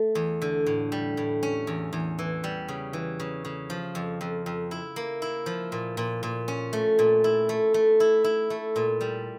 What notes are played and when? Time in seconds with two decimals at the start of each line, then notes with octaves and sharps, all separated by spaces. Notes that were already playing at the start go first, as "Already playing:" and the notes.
Already playing: A3
0.15 E2
0.42 D3
0.66 A2
0.92 G3
1.17 A2
1.43 C#4
1.67 E2
1.93 E2
2.19 E3
2.44 G3
2.68 C#3
2.93 E3
3.20 C#3
3.45 C#3
3.70 F3
3.95 F2
4.21 F2
4.46 F2
4.71 E4
4.96 A#3
5.22 E4
5.46 F3
5.72 A#2
5.97 A#2
6.23 A#2
6.48 C#4
6.73 A3
6.99 A#2
7.24 E4
7.49 A3
7.74 A3
8.00 E4
8.24 E4
8.50 A3
8.76 A#2
9.01 G3